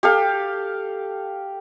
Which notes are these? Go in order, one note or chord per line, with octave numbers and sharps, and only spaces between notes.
G4 A4 F5